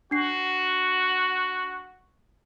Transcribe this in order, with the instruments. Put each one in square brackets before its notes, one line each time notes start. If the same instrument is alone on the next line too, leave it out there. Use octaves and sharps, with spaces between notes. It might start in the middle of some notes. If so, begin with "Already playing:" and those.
[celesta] D4 C7 [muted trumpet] F#4